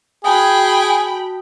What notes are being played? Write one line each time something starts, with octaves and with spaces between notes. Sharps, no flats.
F#4 G#4 G5 A5 B5 D#6